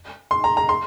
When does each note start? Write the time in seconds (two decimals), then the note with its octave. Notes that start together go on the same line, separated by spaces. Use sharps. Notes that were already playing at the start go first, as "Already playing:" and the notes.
0.31 C6
0.44 A#5
0.57 A#5
0.69 C6